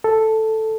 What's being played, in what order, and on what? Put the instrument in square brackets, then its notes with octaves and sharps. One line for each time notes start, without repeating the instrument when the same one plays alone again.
[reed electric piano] A4